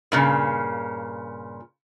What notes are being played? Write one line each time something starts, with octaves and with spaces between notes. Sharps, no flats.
G2 A#2 C#3